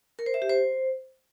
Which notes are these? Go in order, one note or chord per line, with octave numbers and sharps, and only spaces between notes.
A#4
C5
E5
G4
C5